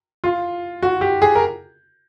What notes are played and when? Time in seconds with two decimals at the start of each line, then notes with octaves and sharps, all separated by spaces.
0.24 F4
0.82 F#4
1.01 G4
1.22 G#4
1.35 A#4